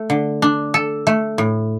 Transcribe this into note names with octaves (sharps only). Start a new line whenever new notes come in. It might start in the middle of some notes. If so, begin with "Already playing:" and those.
Already playing: A3
D3
D4
A4
A3
A2